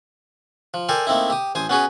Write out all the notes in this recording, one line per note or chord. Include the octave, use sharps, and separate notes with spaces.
F3
A4 A#4 C5 D5 G5 G#5
A3 A#3 C4 D#4 E4
G4 D#6
A1 C5 G#5 D#6
B3 C#4 F#4 G#4 B4